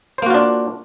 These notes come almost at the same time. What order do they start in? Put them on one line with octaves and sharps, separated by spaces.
C5 A#3 F#4 F4 D4